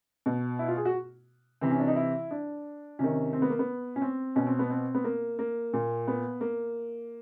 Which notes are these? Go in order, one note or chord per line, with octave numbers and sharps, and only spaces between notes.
B2
E4
F4
G#4
F#4
C3 E3 C4
C#4
D4
D#4
E4
D4
C3 D#3 C#4
C4
B3
A#3
B3
C#4
C4
B2 C#4
C4
B3
C4
B3
A#3
A#3
A#2
B3
A#3